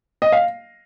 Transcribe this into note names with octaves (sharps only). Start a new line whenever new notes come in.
D#5
F5